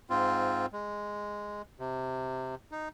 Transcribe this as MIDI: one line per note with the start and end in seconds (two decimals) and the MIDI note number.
0.10 0.66 44
0.10 0.66 60
0.10 0.66 65
0.72 1.62 56
1.79 2.55 48
2.71 2.88 63